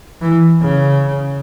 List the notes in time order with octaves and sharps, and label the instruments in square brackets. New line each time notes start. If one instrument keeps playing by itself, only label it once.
[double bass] E3
C#3